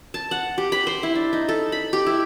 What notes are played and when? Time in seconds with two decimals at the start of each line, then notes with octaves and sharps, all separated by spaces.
0.14 A5
0.31 F#5
0.58 G4
0.72 B5
0.87 C5
1.03 E4
1.16 D4
1.33 D#4
1.49 A4
1.72 B5
1.93 G4
2.06 E4